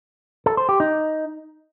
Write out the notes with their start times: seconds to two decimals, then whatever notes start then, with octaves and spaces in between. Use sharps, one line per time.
0.46 A4
0.57 C5
0.69 G4
0.80 D#4